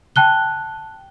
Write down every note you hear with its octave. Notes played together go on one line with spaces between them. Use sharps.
G5 A5 F#6 G7